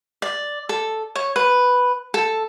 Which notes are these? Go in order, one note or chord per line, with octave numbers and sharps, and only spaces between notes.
D5
A4
C#5
B4
A4